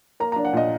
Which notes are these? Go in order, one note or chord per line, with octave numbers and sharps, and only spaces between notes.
A#3 A#5
D4 A#5
F#5
A#2 D#5